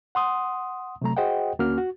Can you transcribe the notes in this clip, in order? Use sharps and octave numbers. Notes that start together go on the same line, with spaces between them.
F#5 C6 D#6
C3 F#3 A3 A#5
F#4 G#4 C5 D#5 F#5 G5
D2 A#3 C#4 F#4 F6
F#4